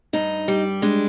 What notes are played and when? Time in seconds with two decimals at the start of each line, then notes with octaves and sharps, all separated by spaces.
0.13 G2 D#4
0.48 G3
0.82 G#3 D4